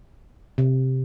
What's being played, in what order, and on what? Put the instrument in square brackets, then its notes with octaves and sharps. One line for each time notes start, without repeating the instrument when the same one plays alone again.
[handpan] C3